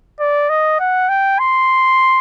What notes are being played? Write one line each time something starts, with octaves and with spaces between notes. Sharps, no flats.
D5
D#5
F#5
G5
C6